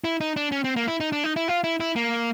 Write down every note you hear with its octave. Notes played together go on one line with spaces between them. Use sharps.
E4
D#4
D4
C#4
C4
A#3
E4
D#4
D4
D#4
E4
F4
E4
E4
A#3